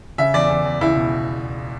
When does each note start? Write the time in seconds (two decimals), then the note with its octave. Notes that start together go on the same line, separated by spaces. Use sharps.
0.18 C#3 E5
0.34 E2 D5
0.49 E2
0.65 E2
0.81 C#2 E4
0.96 B2